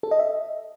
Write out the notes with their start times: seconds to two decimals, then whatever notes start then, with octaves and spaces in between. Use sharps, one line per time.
0.03 A4
0.11 D#5
0.19 E5